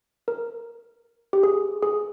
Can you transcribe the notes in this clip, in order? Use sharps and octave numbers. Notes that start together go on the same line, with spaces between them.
A#4
G4
G#4
G#4